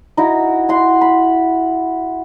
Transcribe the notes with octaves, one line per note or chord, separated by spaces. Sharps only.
D#4 E4 F#4
E4 F#5 C6
B5